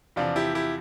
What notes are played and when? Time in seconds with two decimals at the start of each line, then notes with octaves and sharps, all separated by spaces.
0.16 E2 C3 F3 D4 F4
0.36 E4 G4
0.55 E4 G4